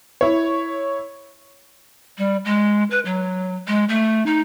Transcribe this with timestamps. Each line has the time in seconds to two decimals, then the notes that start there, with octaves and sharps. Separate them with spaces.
0.21 E4 C#5
2.18 G3
2.45 G#3
2.91 B4
3.05 F#3
3.68 G#3
3.89 A3
4.26 D#4